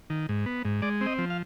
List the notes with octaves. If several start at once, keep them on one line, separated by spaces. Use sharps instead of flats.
D#3
G#2
B3
G#2
G#3 D5
C4
D#5
F3
F5